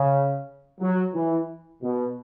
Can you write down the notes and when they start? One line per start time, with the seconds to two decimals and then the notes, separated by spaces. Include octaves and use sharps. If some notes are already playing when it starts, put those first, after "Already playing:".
Already playing: C#3
0.80 F#3
1.15 E3
1.82 B2